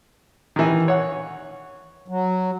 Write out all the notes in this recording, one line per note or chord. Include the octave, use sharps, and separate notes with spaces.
D#3 E3
C#5 F#5
F#3